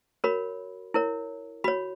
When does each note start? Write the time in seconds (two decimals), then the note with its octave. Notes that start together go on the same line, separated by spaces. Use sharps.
0.24 F#4 A#4 C#5 B5
0.94 E4 A#4 C#5
1.64 F#4 C#5 B5